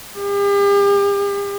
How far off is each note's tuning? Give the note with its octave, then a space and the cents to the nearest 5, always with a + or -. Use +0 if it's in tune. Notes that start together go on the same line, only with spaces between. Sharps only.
G4 +40